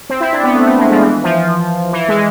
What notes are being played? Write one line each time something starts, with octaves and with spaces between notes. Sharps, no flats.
C4
E4
D4
B3
A3
A3
G#3
F3
E3
F3
E3
G#3